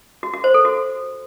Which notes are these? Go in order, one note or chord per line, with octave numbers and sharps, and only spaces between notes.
F#4
F#4
C5
A4
F#4